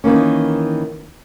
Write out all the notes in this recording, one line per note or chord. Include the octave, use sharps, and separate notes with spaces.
D#3 E3 A#3 C#4